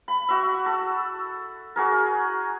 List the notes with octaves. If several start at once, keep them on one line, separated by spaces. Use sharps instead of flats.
B5
F#4 E5
A4
F#4 G#4 A#4